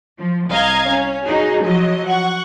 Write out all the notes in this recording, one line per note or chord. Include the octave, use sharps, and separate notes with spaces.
F3
C2 D#5 F5 A#5 G#6
C#4
D#4 F#4 G#4
F3 F#3 D#5
F#5 C#6